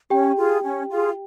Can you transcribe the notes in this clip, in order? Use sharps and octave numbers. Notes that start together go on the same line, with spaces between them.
C#4 G4 G5
F4 G#4
C#4
F4 G#4